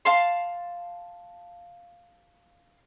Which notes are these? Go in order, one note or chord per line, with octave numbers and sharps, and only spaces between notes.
F5 A5 C6